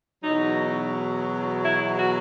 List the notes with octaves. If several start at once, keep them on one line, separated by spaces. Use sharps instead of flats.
E2 B2 F#3 D#4
E4
F#4